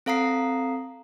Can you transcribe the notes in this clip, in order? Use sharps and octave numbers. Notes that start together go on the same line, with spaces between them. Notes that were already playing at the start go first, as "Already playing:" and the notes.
C4 A4 F5 A#5 D#6 C7